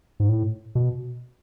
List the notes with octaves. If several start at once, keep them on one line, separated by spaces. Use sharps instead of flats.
G#2
A2
B2